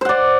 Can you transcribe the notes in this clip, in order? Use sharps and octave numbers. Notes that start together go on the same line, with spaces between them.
C5 D5 F#5